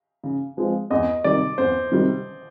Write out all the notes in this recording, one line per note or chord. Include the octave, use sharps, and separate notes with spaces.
C#3
F3 G#3 C4 F4
E2 D#5
C3 D#3 G3 D5
E2 C5
C3 D#3 G3